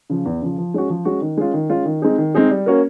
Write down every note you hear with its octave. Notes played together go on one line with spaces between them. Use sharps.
C#3 F3
E2
C#3 F3
F3
G#3 C#4 F#4
F3
G#3 C#4 F#4
D#3
G#3 C#4 F4
D#3
G#3 C#4 F4
D#3
G#3 C4 D#4 G#4
D#3
G#3 C4 D#4 G#4
G3
A#3 C#4 F#4 A#4